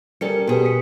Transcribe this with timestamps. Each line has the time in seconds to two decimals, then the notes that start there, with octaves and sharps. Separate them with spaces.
0.21 G3 C#4 A4 A#4 C#7
0.47 B2 G4 G#4 B4
0.64 D#6 B6 C#7